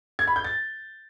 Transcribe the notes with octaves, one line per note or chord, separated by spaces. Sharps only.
G#6
B5
G6
A6